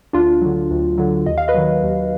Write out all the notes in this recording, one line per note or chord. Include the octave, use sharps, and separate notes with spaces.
D2 D4 F4
D3 F#3
D2
D3 F#3
D#2 D#5
F5
B4 D#5
D#3 F#3
D#2